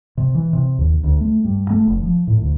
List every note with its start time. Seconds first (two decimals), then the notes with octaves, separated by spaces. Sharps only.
0.17 C3
0.35 E3
0.53 C3
0.79 D#2
1.04 D2
1.21 A3
1.45 G2
1.70 A3
1.87 F1
2.03 F3
2.27 A2
2.41 D2